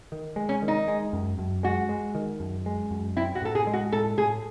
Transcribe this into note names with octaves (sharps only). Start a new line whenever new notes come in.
D#3
G#3
C#4
D#3
D#4
G#3
F#2
F#2
G#3 F#4
G#3
D#3
F#2
G#3
F#2
C4 E4
F#4
A2 A4
G#4
G#3
F#4
A2 A4
A2 G#4